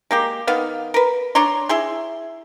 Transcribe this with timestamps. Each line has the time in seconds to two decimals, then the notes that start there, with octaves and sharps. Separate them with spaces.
0.11 G#3 A#3 G4
0.47 D#3 B3 F5
0.94 A#4 B4
1.35 D4 C#5 A#5 C6
1.69 E4 G#4 C6